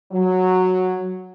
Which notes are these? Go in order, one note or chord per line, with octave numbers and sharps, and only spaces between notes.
F#3